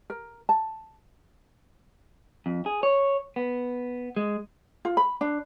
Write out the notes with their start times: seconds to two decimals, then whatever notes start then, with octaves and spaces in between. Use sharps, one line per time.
0.10 A#4
0.49 A5
2.46 F2
2.66 G#4
2.83 C#5
3.36 B3
4.16 G#3
4.85 F4
4.97 B5
5.21 D4